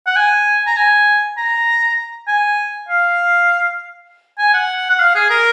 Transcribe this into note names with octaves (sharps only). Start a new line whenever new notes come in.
F#5
G#5
A#5
G#5
A#5
G#5
F5
G#5
F#5
F#5
F5
G#4
A#4